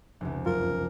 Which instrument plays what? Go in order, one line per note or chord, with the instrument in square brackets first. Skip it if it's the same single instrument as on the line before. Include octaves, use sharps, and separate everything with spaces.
[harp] F1 C#2
[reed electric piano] F#2 F4 [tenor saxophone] A#4